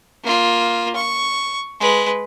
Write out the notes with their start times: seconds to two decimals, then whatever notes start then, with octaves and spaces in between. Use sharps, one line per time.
0.24 A#3 F4
0.96 C#6
1.80 G#3 B4